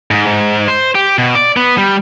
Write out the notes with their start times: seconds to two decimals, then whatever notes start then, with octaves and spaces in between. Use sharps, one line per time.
0.11 G#2
0.26 G#2
0.68 C5
0.95 G4
1.18 B2
1.35 D5
1.57 B3
1.78 G3